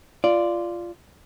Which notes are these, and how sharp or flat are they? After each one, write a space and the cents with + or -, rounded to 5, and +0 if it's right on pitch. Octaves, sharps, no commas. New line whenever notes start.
F4 -10 D5 +0